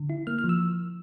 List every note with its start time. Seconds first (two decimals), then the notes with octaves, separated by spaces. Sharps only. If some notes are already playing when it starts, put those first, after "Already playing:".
Already playing: D3
0.10 E4
0.27 A#3 F6
0.39 F6
0.44 F3
0.49 E6